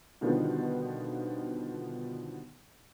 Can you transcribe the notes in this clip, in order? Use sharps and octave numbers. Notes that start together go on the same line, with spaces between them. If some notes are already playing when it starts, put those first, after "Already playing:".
B2 D3 D#3 F3 G3 B3